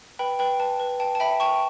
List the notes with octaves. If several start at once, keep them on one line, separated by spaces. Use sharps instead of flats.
B4 G5 B5
B4 G5 B5
B4 A5
B4
G5 A5
A5
E5 G5 B5
G5 A5 C#6